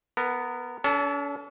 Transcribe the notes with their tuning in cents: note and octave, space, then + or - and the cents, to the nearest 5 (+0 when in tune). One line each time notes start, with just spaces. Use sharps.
B3 +0 A#4 -25
C#4 +45 A4 +0